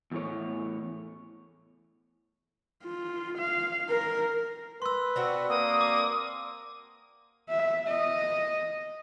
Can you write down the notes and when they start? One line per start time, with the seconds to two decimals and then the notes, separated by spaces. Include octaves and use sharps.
0.11 E2 A2 C#5
2.84 F4
3.39 F5
3.90 A#4
4.82 B4 C6 E6
5.16 C4 D4 F#4
5.49 A#3 D#6
5.81 D6
7.50 E5
7.87 D#5